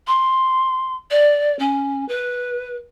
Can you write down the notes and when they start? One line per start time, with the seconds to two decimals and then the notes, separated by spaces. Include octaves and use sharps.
0.07 C6
1.11 D5
1.59 C#4
2.08 B4